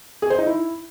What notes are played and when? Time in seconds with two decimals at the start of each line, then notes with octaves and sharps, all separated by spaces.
0.22 G#4
0.30 C5
0.38 D#4
0.46 E4